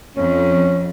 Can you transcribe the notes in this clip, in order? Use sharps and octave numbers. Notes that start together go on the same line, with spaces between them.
F2 C#4